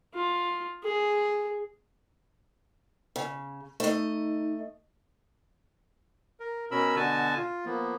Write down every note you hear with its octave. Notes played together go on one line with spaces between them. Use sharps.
F4
G#4
C#3
A3 D#4 D#5
A#4
B2 C#4 A#4 B5 E6
B2 D3 F#4 G#5 A5
F4
F3 A#3 B3